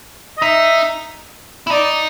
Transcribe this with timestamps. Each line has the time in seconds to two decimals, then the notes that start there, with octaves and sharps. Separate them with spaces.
0.38 D#5
0.42 D#4 E5
1.67 E4
1.71 D#4 D5